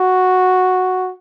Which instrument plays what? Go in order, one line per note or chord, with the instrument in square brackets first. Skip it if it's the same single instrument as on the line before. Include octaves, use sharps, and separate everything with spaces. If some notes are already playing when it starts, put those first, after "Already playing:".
Already playing: [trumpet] F#4